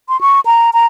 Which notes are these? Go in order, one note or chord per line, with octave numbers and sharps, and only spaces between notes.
C6
C#6
A#5
A#5